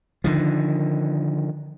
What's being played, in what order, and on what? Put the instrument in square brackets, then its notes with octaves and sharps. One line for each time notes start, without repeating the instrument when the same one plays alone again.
[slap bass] D3 D#3 F3